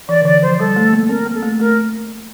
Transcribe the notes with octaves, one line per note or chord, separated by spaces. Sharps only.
E3 D5
D3
E3 D5
F3 C5
G3 A4
A3
A#3
C4 A#4
A#3
A4
A3
A3 A#4